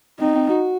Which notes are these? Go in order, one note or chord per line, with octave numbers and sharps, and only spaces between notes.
C4 D#4
C4
F#4